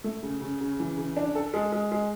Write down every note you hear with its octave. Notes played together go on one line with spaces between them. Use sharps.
A3
C#3
C#3
C#3
E3
C#3
D4
A4
G#3
G#3
G#3